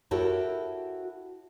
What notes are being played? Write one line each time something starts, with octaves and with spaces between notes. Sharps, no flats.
E4 F#4 G4 A4 A#4 C#5